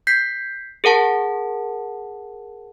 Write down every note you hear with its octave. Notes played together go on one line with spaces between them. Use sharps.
G6 B6 C7
G#4 A#4 F#5 A5